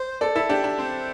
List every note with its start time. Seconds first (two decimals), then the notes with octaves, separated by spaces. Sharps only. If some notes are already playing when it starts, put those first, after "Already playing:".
Already playing: C5
0.21 A4 D5
0.36 E4 A4
0.49 D4 G4
0.64 D4
0.78 C4 C5